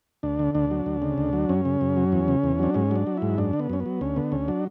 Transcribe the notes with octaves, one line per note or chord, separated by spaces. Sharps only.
D2 D4
D3
D2 D4
F#3
D2
C#3
D2
F#3
F#2 C#4
C#3
F#2
F#3
E2
C#3
E2
F#3 D4
G#2 C#4
F#3 D4
F#3
G#2 E4
F#2 D4
D3
B3
F#2 C#4
B3
F#3
D2 C#4
D3 B3
D2 C#4
F#3 D4